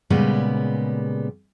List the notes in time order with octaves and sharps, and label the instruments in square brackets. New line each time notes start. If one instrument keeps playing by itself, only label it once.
[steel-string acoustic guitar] A#2 C#3 G3 G#3 B3